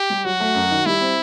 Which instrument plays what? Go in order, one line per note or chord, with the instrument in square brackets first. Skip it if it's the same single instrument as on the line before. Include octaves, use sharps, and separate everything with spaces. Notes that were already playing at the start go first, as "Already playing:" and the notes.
Already playing: [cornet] G4
[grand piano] G3
[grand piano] F#3 [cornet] F#4
[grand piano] A3
F#2
D#3
[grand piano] G3 [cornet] E4
[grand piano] C4